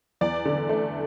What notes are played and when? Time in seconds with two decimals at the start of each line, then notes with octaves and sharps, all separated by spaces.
0.21 E2 D5
0.45 D3
0.69 A3